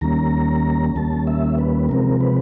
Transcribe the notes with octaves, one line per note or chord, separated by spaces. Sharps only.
D#2 D#3 G3 A#3 C#4 A#5
D#2 D#3 G3 A#3 C#4 A5
E5
B4
C3 F3 G#3 C4 A#4
B4